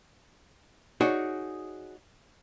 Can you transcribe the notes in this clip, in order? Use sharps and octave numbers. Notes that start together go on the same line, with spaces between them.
D#4 F#4 G#4 C#5 D5